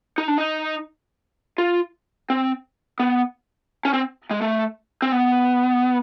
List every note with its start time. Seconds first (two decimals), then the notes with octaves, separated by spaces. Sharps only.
0.18 D#4
0.28 D4
0.38 D#4
1.58 F4
2.30 C4
3.00 B3
3.85 C#4
3.93 C4
4.31 G#3
4.41 A3
5.02 C4
5.12 B3